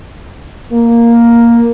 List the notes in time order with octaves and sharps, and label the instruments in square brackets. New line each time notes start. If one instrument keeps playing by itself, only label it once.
[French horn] A#3